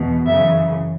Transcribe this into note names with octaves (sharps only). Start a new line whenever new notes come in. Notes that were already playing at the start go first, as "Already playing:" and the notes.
Already playing: E2 B2
F#2 C#3 E3 E5